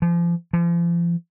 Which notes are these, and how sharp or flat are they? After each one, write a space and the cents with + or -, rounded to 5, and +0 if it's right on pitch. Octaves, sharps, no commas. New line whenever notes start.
F3 -35
F3 -40